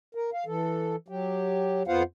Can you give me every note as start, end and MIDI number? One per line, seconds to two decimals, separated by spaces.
0.15 0.30 70
0.34 0.44 77
0.46 0.96 52
0.46 0.96 69
1.08 1.83 54
1.08 1.83 67
1.88 2.03 41
1.88 2.03 59
1.88 2.03 65
1.88 2.03 72
1.88 2.03 77
1.88 2.03 78